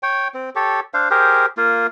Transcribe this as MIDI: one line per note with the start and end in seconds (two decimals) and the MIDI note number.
0.03 0.28 73
0.03 0.28 79
0.34 0.50 60
0.55 0.80 67
0.55 0.80 69
0.55 0.80 73
0.94 1.09 62
0.94 1.09 72
0.94 1.09 77
1.10 1.46 67
1.10 1.46 68
1.10 1.46 70
1.10 1.46 72
1.57 1.87 58
1.57 1.87 65